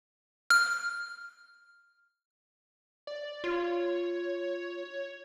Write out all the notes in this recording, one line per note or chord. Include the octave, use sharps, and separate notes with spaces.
F6
D5
F4 C#5